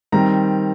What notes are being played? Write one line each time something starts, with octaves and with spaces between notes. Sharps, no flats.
D#3 G3 C4 A#5